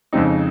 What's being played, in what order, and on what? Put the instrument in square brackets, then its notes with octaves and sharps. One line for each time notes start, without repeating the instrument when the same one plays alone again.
[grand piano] F2 C#3 G#3 C4 D#4